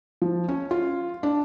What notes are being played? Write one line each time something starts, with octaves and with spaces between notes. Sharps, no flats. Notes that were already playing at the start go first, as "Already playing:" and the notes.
F3
C#4
F4
D4